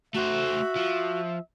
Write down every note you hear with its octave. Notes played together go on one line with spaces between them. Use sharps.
A3 F#4 C5 E5
F3